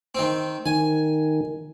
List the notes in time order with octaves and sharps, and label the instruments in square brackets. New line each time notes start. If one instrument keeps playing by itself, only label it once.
[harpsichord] D#3 C4
[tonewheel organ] D#3 [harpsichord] G#5